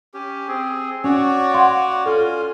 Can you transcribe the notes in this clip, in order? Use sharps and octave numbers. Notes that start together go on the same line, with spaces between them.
C#4 G4
C4 G#4
C#4 F#4 C#5 D5
F5 F#5 C6
C#4 F4 A4